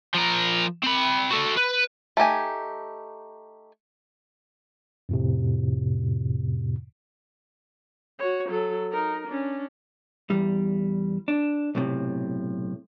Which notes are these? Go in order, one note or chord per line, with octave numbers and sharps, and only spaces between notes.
F3 A#4
C4 B5
F#4 A4
B4
A3 D#4 G4 G#5
F2 A2 C3
F#4 C#5
F#3 A4
D#4 A#4
C#4 D4
E2 G3
D4
B1 A2 C3